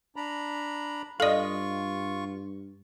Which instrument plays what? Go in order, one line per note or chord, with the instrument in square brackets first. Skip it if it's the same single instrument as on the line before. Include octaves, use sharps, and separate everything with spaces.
[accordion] D4 A#5 B5
[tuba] G2 [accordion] F4 C#6 [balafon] A4 D5 [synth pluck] D#5 F5